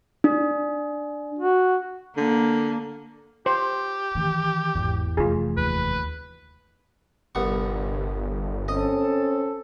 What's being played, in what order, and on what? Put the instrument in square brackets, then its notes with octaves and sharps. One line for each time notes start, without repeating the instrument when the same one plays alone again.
[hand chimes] D4
[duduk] F#4
[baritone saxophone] D3 [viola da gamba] A#3
[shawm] G4 [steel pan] C5
[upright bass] D#3 E3
[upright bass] G#1 [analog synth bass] E2
[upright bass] F1 E3 [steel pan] F4 G#4
[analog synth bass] D#2 [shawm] B4
[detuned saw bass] G1 [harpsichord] C2 B3 C#6
[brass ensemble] C4 C#4 A4 [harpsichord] D#5